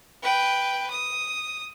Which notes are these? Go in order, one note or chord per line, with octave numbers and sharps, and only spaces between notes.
B4 G5
D#6